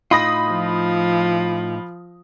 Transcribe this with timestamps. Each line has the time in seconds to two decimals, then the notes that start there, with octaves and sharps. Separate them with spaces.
0.11 A2 D#4 F4 B5 D#6 A#6
0.50 F3